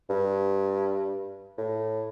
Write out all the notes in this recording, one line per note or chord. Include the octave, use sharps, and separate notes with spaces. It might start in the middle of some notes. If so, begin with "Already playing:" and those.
G2
A2